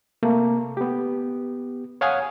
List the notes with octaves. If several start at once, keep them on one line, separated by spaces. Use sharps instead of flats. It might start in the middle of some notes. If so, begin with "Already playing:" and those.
C3 A3 A#3
B3 G4
C#5 F5 F#5 G#5 D#6